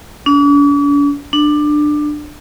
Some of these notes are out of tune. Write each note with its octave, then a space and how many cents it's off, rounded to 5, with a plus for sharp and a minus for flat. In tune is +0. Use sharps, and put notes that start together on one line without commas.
D4 -45
D4 +20